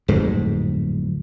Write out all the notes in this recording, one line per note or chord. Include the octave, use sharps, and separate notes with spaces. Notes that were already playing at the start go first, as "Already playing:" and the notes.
D1 F2 G#2